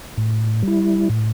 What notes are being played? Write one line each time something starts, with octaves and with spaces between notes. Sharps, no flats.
A2
G3 E4
A2